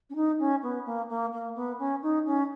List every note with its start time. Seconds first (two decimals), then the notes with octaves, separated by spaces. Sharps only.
0.10 C#4
0.15 D#4
0.39 C#4
0.62 B3
0.85 A#3
1.09 A#3
1.32 A#3
1.55 B3
1.79 C#4
2.02 D#4
2.26 C#4